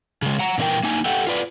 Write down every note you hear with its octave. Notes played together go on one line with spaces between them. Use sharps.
C#3 G#3
F#5 A#5
A#2 E3 C#4 A#4 G5
A#3 D#4 G#5
G4 A4 E5 F#5 G5
F4 B4 D5